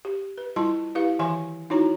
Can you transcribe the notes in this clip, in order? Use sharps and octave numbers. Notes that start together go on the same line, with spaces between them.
G4
B4
G3 E4 F4 A5 C6
E4 G4 B4 F5
D#3 E3 E5 G#5 C6
D#4 E4 F#4 C#5 A#5